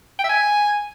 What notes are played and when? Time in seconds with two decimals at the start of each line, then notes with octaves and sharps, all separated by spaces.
0.19 G5
0.24 E5
0.29 G#5